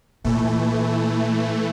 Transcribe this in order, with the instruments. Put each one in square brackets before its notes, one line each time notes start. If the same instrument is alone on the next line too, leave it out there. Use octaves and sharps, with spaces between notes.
[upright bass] A#2 [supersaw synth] E3 A3